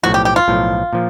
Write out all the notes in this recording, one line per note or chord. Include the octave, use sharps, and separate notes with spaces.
B1 A2 F3 F#4
G4
G4
F4
B1 A2 F3
A#2 F3